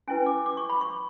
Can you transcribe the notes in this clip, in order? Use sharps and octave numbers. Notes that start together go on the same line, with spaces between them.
C#4 E4 B4 G#5
D6
D6
C#6
B5
C#6